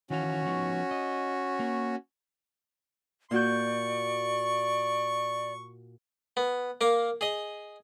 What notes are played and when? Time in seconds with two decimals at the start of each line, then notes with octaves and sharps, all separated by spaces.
0.10 D#3 E3 C#4 F#4 F5
0.45 F3 B3 D#4
0.91 D#5
1.59 A#3
3.31 A#2 F#4 D5 C#6 G6
6.37 B3
6.81 A#3 A#4 F5
7.21 G#4 D#5